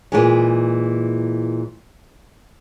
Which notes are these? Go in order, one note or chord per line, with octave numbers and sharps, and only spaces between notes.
A#2 E3 G#3